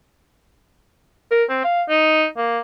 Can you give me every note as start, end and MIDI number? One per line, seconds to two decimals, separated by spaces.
1.31 1.44 70
1.49 1.60 60
1.64 1.83 77
1.89 2.26 63
2.37 2.60 58